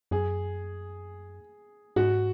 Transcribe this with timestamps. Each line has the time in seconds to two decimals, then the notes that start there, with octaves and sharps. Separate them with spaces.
0.11 F#2 G#4
1.96 G#2 F#4